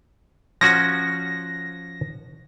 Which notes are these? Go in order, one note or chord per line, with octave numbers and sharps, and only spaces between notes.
F3 C#4 F#4 A#6